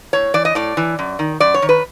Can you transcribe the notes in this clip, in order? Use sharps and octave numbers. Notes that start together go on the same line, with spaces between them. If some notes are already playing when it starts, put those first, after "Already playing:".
A2 C#5
E3 D5
D#5
A2 D5
E3
F#2
D#3
F#2 D5
C#5
D#3
B4